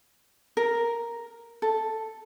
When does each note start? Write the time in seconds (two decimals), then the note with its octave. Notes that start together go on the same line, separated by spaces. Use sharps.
0.57 A#4
1.62 A4